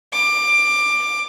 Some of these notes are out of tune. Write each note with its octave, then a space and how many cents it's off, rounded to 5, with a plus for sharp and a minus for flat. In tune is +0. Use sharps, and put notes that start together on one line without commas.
D6 +20